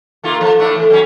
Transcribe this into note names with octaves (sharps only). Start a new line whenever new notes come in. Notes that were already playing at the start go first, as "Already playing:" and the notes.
A3 A#3 F4
F3
A2 A3 D4
E3
F#3 C#4